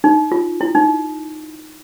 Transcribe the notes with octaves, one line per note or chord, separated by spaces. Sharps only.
D#4
F4
E4
D#4